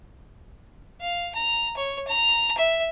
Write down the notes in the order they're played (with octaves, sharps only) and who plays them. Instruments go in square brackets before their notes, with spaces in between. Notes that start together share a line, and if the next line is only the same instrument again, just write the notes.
[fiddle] F5
A#5
C#5
A#5
E5